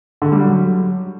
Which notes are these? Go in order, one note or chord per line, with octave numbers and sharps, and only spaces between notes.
D3
G3
F#3